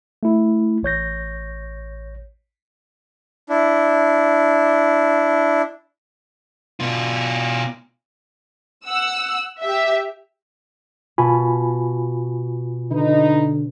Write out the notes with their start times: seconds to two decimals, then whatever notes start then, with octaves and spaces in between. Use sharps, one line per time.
0.23 A3 E4
0.83 A1 C#5 G6 A#6
3.49 D4 E4
6.80 B2 F4
8.86 F#5 E6
9.61 G4 E5
11.18 B2 F4 G#5 B5
12.91 D3 D#4 B4